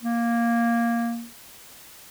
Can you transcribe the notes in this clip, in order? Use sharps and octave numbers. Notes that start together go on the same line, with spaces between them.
A#3